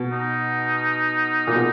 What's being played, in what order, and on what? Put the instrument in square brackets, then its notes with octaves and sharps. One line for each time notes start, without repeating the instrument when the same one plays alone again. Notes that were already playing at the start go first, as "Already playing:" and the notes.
Already playing: [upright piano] B2
[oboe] D#4
[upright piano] A#2
B2